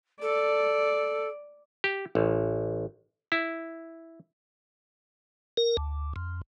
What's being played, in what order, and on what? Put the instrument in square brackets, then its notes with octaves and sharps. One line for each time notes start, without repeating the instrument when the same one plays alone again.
[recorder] A4 [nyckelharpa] D5
[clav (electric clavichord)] G4
A1
E4
[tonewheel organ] A#4
D2
F2